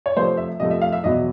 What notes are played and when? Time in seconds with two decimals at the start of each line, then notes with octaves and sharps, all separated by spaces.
0.06 C#5
0.16 C3 F3 A3 C5
0.37 E5
0.60 C3 F3 A3 D#5
0.71 E5
0.81 F5
0.92 E5
1.04 E2 B2 F#3 D#5